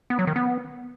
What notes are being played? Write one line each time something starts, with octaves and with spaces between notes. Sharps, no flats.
B3
F#3
D#3
B3